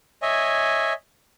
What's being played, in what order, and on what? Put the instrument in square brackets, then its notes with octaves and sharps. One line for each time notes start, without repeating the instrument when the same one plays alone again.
[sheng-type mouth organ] C#5 D#5 E5 G#5